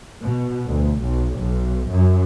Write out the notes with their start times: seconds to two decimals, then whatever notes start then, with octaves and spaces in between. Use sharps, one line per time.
0.22 B2
0.69 D2
1.03 B1
1.40 B1
1.89 F#2